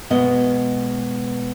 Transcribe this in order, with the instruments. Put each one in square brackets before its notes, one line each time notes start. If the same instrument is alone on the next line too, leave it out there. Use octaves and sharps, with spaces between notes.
[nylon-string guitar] B2 G#3 B3 D#5